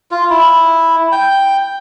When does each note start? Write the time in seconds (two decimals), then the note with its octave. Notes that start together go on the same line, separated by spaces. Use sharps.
0.11 F4
0.30 E4
1.12 G5